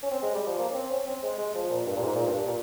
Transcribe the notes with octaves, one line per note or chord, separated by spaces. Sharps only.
C#4
C4
G#3
G3
F3
A#3
C#4
C4
C#4
C4
G#3
G#3
F3
A#2
G2
A#2
G#2
A#2
G2
A#2